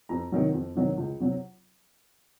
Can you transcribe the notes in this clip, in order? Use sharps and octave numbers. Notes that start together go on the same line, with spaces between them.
F2 A#5
C3 D#3 F#3
F2
C3 D#3 F#3
C#2
C3 F#3